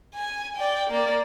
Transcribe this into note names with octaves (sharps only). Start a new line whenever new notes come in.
G#5
D5 G5
A#3 D5